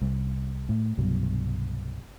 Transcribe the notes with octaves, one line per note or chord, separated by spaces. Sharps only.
C2
A2
C2 G2 B2 F#3